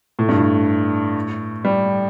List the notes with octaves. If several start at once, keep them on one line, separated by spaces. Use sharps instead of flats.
A2
G2
A2
G3